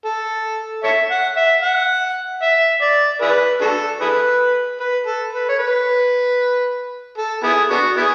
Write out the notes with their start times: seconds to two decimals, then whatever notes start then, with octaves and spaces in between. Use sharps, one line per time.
0.05 A4
0.84 A4 C#5 E5
1.11 F#5
1.37 E5
1.63 F#5
2.42 E5
2.82 D5
3.22 E4 G#4 B4
3.61 D4 F#4 A4
4.01 E4 G#4 B4
4.80 B4
5.06 A4
5.33 B4
5.49 C#5
5.59 B4
7.18 A4
7.43 B3 E4 G#4
7.71 B3 D4 F#4
7.97 B3 E4 G#4